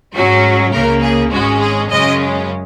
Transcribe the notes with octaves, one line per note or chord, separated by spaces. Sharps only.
G#2 F#3 C#4 F#4
C#2 C#3 A#3 A#4
G#4
G#1 G#2 G#3 C#4 F#4
G#4
F#2 C#3 G#3 C#4 D#5